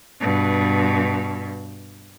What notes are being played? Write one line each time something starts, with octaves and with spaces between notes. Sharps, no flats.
G2 B2